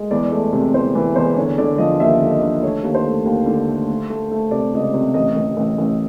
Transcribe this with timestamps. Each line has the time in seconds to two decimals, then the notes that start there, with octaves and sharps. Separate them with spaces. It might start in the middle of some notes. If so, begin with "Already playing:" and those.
Already playing: G#3
0.11 E2 D5
0.32 A3
0.53 C3
0.74 E2 C5
0.95 E3
1.16 E2 C5
1.37 D3 C#5
1.58 D3 D5
1.78 F3 D#5
2.00 D#2 E5
2.20 D3
2.31 D#5
2.42 D3
2.63 A3 C#5
2.83 D#2
2.95 C5
3.05 A3
3.26 D#2
3.46 D3
3.68 A3
3.89 A3
4.10 A3
4.31 A3
4.51 C3 D5
4.73 C#2 D#5
4.83 D5
4.94 C3
5.14 A1 D#5
5.36 A1
5.57 A1
5.78 A1